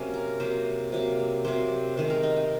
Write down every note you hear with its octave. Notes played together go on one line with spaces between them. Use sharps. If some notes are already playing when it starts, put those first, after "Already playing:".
Already playing: C3 F#3 A#3 C#4
A#4
C3 F#3 A#3 C5
C3 F#3 A#3
C3 F#3 A#3 C5
C3 D#3 G#3 C5
A#4
D#4
D#4